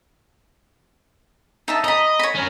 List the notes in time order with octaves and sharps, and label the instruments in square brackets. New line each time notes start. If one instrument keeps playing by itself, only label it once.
[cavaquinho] D#4 E5 A5
[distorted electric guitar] D#5 [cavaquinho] A#5 B5
[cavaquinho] C#5 B5
[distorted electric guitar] C#4 A#4